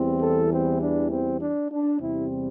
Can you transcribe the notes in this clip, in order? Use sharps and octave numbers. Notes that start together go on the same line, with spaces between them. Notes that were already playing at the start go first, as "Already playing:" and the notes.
Already playing: E2 E3 G3 C4
A4
C4
D4
C4
D4
D4
E2 C3 G3 C4 E4